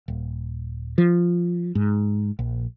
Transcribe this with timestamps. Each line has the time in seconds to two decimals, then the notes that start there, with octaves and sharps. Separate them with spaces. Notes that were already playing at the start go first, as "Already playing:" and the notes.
0.08 D#1
0.98 F3
1.75 G#2
2.39 A#1